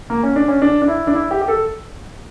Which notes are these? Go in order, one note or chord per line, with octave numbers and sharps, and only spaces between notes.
A#3
C#4
D4
C#4
D4
D4
E4
D4
E4
G4
G4
A4